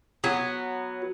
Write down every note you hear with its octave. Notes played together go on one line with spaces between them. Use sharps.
F#3 B3